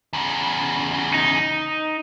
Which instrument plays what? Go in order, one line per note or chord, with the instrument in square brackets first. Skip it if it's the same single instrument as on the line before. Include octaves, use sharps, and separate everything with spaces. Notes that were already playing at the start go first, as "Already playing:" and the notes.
[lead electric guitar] E2 C#3
[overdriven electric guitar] D#4